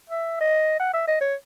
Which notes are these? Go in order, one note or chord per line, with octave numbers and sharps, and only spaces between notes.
E5
D#5
F#5
E5
D#5
C#5